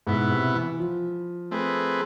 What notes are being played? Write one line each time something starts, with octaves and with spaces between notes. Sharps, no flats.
G#2 B2 B3 E4
C3
E3
F3
A3 C4 G#4 B4